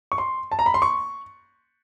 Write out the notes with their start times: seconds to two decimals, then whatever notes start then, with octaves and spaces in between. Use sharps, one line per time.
0.12 C#6
0.18 C6
0.52 A5
0.59 A#5
0.66 B5
0.74 C6
0.82 C#6